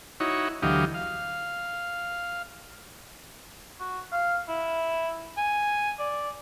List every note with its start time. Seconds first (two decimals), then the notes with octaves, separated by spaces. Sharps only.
0.20 D#4 E4 F#4 C#5
0.62 D2 E3 F#3 G4 D#5 F5
0.94 F5
3.80 F#4
4.12 F5
4.48 E4
5.38 G#5
5.99 D5